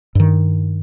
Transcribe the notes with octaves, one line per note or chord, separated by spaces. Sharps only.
G2 D#3